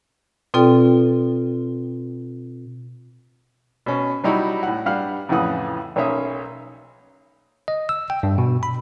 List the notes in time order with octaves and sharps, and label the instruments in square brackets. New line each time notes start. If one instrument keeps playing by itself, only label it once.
[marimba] B2 C4 F4 A4 D5 G5
[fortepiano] B2 C#4
F#3 G3 D#4 E4 F#4
A2 F#5
G2 G3 F5 F#5 F6
F2 A2 C#3 E3 F#5 D#6
B1 A#3 C#4 C#5 E5 D#6
[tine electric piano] D#5
E6
G5
G2
B2
B5